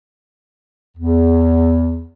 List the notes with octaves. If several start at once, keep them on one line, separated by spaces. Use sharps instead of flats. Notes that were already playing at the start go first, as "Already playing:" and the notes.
E2